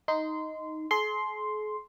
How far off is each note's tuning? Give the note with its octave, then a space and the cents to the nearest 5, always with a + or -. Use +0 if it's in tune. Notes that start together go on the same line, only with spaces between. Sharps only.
D#4 +5 C6 -20
G#4 +45 C6 +0